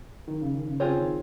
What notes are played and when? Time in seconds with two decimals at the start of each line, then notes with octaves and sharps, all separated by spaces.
0.28 D#3
0.41 C#3
0.54 D#3
0.67 C#3
0.80 C#3 C4 F4 G#4 C#5
0.97 D#3